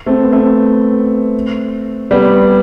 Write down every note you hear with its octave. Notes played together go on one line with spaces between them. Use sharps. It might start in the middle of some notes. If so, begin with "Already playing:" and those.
A3 C4
B3
A3 C4
G3 B3